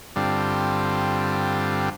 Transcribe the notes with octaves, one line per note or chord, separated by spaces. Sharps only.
G2 D3 G3 C4 F4